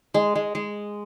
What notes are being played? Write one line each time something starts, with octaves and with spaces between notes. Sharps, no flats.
G#3
G#3
G#3